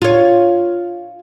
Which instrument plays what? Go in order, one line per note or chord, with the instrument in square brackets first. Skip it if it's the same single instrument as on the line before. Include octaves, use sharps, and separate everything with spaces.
[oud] F4 C#5